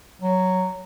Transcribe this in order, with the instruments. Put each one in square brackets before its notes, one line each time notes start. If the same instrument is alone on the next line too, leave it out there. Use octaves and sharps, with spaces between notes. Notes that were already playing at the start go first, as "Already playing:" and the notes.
[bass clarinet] F#3